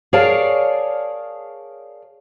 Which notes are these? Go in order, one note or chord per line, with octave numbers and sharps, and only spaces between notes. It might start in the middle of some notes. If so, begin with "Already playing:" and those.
G#4 A#4 C#5 D5 F5 A5